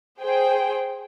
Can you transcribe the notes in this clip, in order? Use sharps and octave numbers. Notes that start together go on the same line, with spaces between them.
G#4 C5 G5